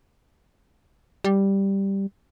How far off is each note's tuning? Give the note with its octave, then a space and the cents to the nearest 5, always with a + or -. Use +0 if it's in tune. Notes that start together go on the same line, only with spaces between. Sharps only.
G3 +0